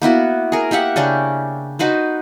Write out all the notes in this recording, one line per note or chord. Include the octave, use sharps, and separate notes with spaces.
A#3 B3 E4 F#4
G#4 A#4
A#3 G4 E5 F#5
C#3 C#4 D4 G4
D#4 F#4 B4 C5